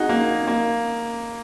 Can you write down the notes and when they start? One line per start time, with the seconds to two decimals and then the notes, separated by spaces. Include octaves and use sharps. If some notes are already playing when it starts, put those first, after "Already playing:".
Already playing: D#4 F#4 G#4
0.09 A#3
0.48 A#3